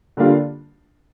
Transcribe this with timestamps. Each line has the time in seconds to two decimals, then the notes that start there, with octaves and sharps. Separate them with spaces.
0.17 D3 G3 A#3 D4 F4